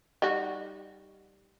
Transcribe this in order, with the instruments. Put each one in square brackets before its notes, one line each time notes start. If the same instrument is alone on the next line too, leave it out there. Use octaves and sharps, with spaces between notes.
[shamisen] G3 D#4 F#4